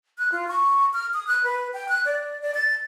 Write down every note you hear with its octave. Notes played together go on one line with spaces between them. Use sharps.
F#6
F4
C#6
F6
D#6
F#6
B4
G5
F#6
D5
D5
A6